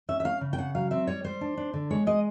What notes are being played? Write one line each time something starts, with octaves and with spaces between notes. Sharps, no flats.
C#4 E5
E5
C#4 F5
C#3
G5
C#3 F#5
F#3 F5
C4 E5
G3 C#5
G3 C5
D4
D4
D3
G#3 C#5
G#3 D#5